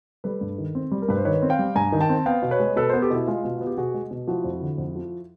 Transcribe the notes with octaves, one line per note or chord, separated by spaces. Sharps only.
G3 A4 B4
G2
D#3
C4
G3
A#4
G2 B4
C5
D#3 B4 C#5
C4
F5 G5
G3
G2 G#5 A#5
D#3
G5 A5
C4
B3 F5 G5
B2
B4 C#5
G#3
B2 A4 B4
B3 A#4 C5
G4 A4
B2 E4
G#3 F4
B2
B3 F#4
G4
B2 F#4 G#4
G#3
B2
F3 E4 F#4
F2
D3
F2
F3